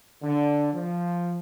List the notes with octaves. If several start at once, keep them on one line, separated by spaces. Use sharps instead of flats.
D3
F3